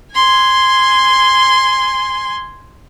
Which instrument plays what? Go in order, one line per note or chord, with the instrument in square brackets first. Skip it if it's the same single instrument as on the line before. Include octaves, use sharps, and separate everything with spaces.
[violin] G#5 C6